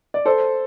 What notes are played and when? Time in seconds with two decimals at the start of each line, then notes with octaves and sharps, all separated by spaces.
0.14 D5
0.25 A4 C5